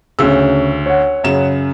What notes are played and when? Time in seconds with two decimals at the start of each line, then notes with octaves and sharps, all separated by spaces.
0.19 D2 C#3 C#4 E6
0.86 C#5 F#5
1.24 F#2 C#3 E7